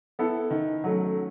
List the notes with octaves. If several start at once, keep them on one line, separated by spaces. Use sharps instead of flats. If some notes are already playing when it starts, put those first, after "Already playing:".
B3 E4 A4
D#3
F#3 A3 C#4